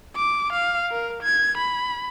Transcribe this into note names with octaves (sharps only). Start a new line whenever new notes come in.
D6
F5
A#4
G#6
B5